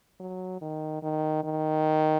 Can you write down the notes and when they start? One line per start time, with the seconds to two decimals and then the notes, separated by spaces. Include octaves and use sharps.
0.20 F#3
0.61 D#3
1.03 D#3
1.44 D#3